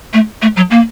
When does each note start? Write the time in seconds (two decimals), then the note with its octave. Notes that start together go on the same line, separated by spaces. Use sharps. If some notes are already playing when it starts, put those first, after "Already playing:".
0.13 A3
0.42 A3
0.57 F#3
0.71 A#3